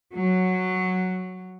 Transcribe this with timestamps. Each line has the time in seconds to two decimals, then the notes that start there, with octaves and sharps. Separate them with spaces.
0.12 F#3